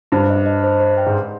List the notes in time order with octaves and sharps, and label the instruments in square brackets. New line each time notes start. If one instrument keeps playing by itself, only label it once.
[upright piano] G2 [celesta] C5
[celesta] D#5
D#5
C5
C5
G5
[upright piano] G#2
[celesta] C6